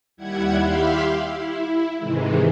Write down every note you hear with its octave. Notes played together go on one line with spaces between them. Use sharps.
D#2 G3 E4 F#5 G#6
G4 E5 F5 B5 C6
E4
G#2 C3 D#3 E3 G#3